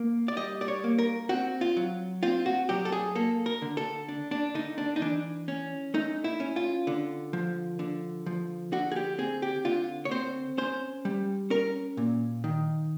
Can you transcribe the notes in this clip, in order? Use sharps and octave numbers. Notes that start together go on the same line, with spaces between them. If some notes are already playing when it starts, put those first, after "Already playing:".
Already playing: A#3
D5
G3 D#5
D5
C#5
A#3
A#4
C4 F#4
F4
F#3
C4 F4
F#4
F#3 G4
A4
G#4
A#3 A4
A#4
D3
A4
D4
D4
D3 D#4
D4
D#4
E3 D4
C#4
A3 D#4
E4
C#4
F4
D3
F3
D3
F3
D3 F#4
G#4
G4
C4 G#4
G4
D3 F4
C#5
C4 C5
C#4 C5
G3
C#4 A#4
A#2
D#3